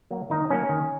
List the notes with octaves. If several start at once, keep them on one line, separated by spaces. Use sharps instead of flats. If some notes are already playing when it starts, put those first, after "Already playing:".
F#3 A#3
D#3 D#4
F#3 A#3 C#4
D#3